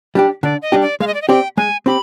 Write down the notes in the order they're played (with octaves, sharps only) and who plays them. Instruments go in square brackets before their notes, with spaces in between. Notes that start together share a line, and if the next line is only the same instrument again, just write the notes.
[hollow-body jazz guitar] G3 D4 G4
[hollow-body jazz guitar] D3 [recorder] D5
[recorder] D#5
[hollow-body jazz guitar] G3 D4 G4
[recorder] D5
[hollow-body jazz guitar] G#3 [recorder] F5
[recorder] D#5
D5
D#5
[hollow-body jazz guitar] C4 G4 D5 [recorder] G5
[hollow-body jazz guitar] G#3 [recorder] G#5
[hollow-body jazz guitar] C4 G4 [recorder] B5